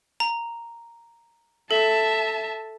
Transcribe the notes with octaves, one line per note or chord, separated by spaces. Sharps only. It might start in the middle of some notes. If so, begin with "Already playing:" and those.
A#5
A4 E5 A5